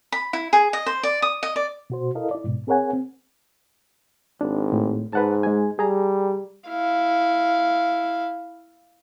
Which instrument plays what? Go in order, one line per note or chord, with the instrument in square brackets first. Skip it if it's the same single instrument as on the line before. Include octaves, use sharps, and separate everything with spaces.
[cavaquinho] B5
E4
G#4
D#5
C5
D5
D#6
D#5
D5
[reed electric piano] B2 F#4 C5
E4 A4 A#4 D#5 F5
E4 D5
G#2 B2
C4 G#4 A#4 C#5 F#5 G#5
C4
[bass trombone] G#1 [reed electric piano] D4
[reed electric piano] A2
[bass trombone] G#2 [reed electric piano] B4 F#5 A5
[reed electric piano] G#3 G#5
[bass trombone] G3 [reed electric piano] G#4 A#5
[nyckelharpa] E4 F5